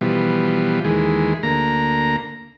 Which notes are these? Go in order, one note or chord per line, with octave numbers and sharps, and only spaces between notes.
B2 E3 F3 G3
D#2 E3 G#3
D2 A#3 A#5